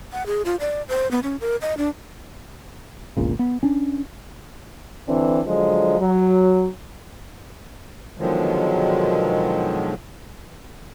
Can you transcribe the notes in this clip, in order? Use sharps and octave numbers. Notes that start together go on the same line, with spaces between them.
F#5
G#4
F4
D5
C5
B3
C#4
A#4
D#5
D4
G1 C#2 A#2 C#3
B3
C#4 D4
D3 E3 C4 D4
D3 F3 F#3 G#3
F#3
B2 D3 D#3 F3 F#3 G#3